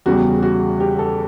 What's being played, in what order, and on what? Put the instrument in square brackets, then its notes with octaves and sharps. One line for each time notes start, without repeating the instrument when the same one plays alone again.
[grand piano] E2 C#3 G3 [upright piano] F#4
[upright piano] F#4
G4
A4